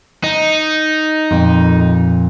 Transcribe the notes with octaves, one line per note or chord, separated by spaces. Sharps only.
D#4
F2 A#2